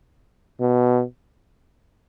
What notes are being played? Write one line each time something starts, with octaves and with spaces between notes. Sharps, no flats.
B2